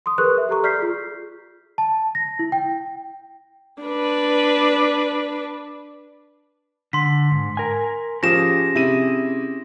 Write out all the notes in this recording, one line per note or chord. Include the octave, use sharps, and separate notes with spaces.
C6 D#6
G#4 A#4 B4 C6 C#6 F#6
E5
G4 A4 A#5 C#6
D5 F6 G6 B6 C7
F4 G#4
A5
A#6
E4
G5
D4 B4
D3 C6 B6
G#2
A#4 G#5
F3 C#4 F4 G4 G#4 A#6 E7
C3 E4 D#7